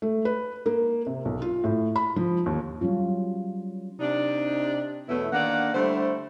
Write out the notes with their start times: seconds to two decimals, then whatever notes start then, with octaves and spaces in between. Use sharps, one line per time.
0.02 A3
0.25 B4
0.66 A#3
1.07 C3
1.25 B1
1.42 F4
1.64 A2
1.96 B5
2.16 F3
2.46 D#2
2.81 F#3 G3 C#4 F4
4.00 C3 D4 D#4
5.09 E2 B2 F#3 A3 B3 E4
5.33 D3 D#3 A#3 D5 F#5
5.74 D3 G3 A3 E4 C5